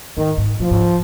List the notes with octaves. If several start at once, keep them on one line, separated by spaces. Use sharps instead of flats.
G#2 D#3
G#2
A#2 F3
G#2